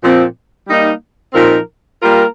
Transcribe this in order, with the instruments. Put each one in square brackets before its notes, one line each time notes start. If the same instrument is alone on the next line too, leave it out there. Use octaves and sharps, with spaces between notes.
[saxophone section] A#2 F3 C4
G3 A#3 D#4
A#2 F3 C4 D#4 A#4
G3 A#3 F4 A#4